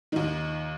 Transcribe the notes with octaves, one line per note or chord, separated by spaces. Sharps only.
D#2 D#3 D#4